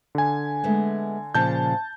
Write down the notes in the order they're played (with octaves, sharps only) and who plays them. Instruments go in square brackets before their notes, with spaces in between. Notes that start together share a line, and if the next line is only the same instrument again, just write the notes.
[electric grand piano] D3 G#5
[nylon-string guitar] G#3 A3 B3
[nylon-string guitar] A#2 C#3 F3 [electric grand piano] A5 G6